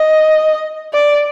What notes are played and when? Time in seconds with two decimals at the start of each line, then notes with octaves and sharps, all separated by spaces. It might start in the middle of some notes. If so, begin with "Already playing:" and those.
Already playing: D#5
0.93 D5